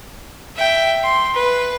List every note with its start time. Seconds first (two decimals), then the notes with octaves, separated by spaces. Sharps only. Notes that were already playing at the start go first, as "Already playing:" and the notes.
0.56 E5 G5
1.03 C6
1.34 B4